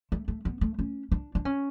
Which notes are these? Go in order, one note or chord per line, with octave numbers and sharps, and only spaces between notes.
A3
A3
B3
A3
C#4
D4
D4
C#4